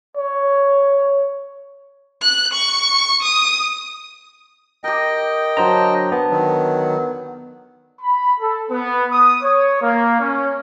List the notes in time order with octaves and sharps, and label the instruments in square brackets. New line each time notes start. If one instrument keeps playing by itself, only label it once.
[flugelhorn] C#5
[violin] F#6
C#6
D#6
[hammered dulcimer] G4 A#4 [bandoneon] D#5 G5
[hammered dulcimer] D3 [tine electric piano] F#3 C5 A#5
[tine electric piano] B3 [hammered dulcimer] A5
[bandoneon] D#3 F#3
[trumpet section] B5
A4
B3
D#6
C#5
A#3
C#4